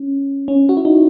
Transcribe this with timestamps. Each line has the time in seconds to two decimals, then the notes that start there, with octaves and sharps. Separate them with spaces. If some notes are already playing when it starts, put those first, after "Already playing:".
Already playing: C#4
0.48 C#4
0.69 F#4
0.77 E4
0.85 D#4